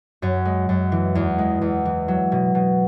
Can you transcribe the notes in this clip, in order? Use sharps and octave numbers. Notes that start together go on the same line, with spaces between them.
F#2 C#4
G#3
F#2
E3
E2
G#3
E2
E3
F#3
B2
B2